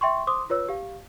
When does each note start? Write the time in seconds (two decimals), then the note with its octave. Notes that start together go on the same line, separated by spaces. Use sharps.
0.01 E5 G5 C6 C#6
0.27 C5 C6 D6 D#6
0.50 F4 B4 C#5 E6
0.69 G4 F5